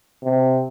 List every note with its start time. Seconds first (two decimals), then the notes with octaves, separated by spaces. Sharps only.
0.24 C3